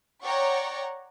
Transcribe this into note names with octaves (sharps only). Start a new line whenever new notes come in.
C#5 D5 F#5 G5 A#5 C#6